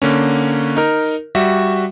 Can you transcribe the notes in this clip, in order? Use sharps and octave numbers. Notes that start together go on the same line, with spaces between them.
D3 A#3 C#4
D#4 A#4
G3 F#4 E5